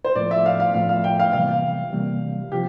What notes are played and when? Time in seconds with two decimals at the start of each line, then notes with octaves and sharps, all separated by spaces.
0.04 C5
0.16 A2 F3 A3 D5
0.31 E5
0.46 F5
0.60 F5
0.74 A2 F3 A3 F5
0.89 F5
1.04 G5
1.19 F5
1.33 C3 E3 G3 A#3 F5
1.93 C3 E3 G3 A#3
2.52 C3 F3 G4